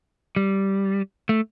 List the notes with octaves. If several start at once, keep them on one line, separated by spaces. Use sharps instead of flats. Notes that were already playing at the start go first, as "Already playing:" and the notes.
G3
A3